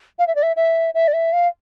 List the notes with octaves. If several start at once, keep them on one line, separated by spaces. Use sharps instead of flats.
F5
E5
D5
E5
E5
E5
D5
E5
F5